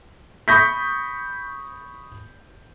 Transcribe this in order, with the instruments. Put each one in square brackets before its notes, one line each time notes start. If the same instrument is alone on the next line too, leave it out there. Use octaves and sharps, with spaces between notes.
[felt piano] B5 C#6 D#6 G6 A#6 B6